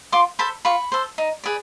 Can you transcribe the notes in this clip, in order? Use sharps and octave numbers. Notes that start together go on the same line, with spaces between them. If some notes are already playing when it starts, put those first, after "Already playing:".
F4 C6 D6
A4 C5 A5 B5
F4 B5 C#6
A4 C5
D#4
G#4 B4 D5